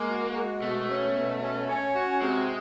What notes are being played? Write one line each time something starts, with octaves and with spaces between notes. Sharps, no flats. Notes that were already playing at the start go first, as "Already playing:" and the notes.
Already playing: G#3 A#3
F#4
G#3
B2 A3
C#4
B2
C#4
C#4
F#4
C3 G#3